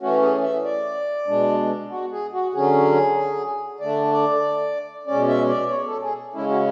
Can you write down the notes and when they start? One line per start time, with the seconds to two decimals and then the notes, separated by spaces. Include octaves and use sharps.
0.01 E3 A3 C#4 F#4
0.22 G#4
0.43 E5
0.64 D5
1.27 B2 G#3 D4
1.91 F#4
2.12 G#4
2.33 F#4
2.54 D3 F#3 C#4 G#4
3.80 D3 A3 D4 D5
4.12 D5
5.07 B2 G#3 C#4 D5
5.28 E5
5.49 D5
5.70 C#5
5.86 A4
6.02 G#4
6.34 C#3 G#3 C#4 E4
6.50 F#4